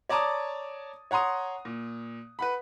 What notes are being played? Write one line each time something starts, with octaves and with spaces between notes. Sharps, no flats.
C#5 D5 A5 A#5 D6 D#6
C#5 F#5 A#5 C6 D#6
A#2
B4 F#5 B5